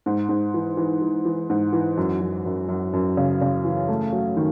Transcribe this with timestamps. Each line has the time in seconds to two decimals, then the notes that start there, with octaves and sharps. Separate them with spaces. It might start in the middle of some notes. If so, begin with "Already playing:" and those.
0.06 G#2
0.29 G#2
0.54 E3
0.77 E3
1.02 E3
1.25 E3
1.50 G#2
1.73 E3
1.97 F#2
2.21 F#2
2.46 F#2
2.69 F#2
2.93 F#2
3.17 C#3
3.41 C#3
3.64 E3
3.88 A3
4.12 F#3
4.37 D#3